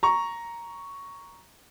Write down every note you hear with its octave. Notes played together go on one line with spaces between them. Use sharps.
A#5 C#6